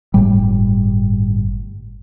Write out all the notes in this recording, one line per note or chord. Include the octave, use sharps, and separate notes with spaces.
G1 A2 G3